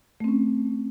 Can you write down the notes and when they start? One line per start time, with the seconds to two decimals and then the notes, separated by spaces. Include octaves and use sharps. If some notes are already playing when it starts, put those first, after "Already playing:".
0.20 A3
0.24 C4
0.28 C#4